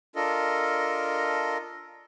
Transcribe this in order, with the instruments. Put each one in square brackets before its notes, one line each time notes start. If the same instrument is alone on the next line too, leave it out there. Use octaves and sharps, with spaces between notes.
[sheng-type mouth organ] D4 F4 A4 A#4 D#5